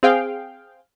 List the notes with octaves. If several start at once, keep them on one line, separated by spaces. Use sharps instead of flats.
C4 G#4 F5 G5